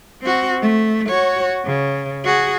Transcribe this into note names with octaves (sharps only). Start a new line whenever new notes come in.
C4 F#4
A3
F#4 C#5
C#3
F#4 G#4